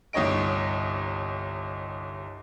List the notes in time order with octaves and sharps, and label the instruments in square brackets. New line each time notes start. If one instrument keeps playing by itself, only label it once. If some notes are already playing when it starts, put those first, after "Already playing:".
[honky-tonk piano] G1 C2 D#4 C#5 D#5 D7